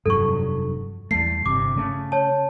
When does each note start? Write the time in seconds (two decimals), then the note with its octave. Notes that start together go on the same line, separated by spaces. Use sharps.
0.06 F1 G2 F#3 A4 C#6
1.11 E2 G3 A3 C7
1.46 G1 C3 D6
1.76 C#3 A3
2.12 C#5 A5